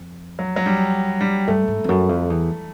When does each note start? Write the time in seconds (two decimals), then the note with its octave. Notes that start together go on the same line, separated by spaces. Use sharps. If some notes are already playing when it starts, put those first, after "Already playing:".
Already playing: F2
0.39 F#3
0.56 F#3
0.66 G3
1.21 G3
1.48 G2 A3
1.68 G#2
1.84 F2
1.89 F#2
2.09 F2
2.30 E2